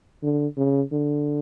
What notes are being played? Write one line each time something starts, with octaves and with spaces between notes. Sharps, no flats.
D3
C#3
D3